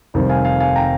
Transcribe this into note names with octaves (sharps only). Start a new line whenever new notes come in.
F1 F2 D#3 G3
F5 G#5
F5 G#5
F5 G#5
G5 A#5